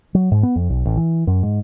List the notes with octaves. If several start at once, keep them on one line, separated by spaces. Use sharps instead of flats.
F#3
G#2
B3
F2
B1
A1
E3
F#2
G#2